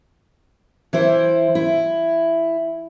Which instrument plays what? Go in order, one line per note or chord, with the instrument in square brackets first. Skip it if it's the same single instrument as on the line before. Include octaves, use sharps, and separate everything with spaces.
[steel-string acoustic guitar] E3 E4 C5
E4